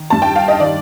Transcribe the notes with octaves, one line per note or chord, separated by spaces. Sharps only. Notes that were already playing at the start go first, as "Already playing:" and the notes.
Already playing: D#3
G2 A5
G5
F5
D#5
D#3 D5